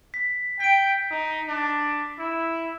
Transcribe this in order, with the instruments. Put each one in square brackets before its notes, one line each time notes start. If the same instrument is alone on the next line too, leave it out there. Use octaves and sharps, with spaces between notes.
[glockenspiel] B6
[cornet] G5 [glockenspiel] B6 D7
[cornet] D#4
D4
E4